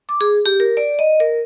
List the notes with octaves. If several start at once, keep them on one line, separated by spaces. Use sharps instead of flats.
D6
G#4
G4
A#4
D5
D#5
A#4